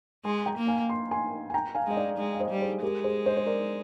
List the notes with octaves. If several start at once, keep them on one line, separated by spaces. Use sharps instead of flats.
G#3 G#5 C6
G5 A#5
A#3
F5 G#5
C6
G#5 C6
G#5
G5 A#5
F5 G#5
G#3 D#5
D5 F5
G#3
F5
C5 D#5
G3
G#4 C5
G#3 G4 A#4
G#4 C5
C5 D#5
C5
A#4 D5